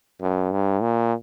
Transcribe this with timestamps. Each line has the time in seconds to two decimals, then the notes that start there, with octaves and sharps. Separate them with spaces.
0.21 F#2
0.51 G2
0.82 A#2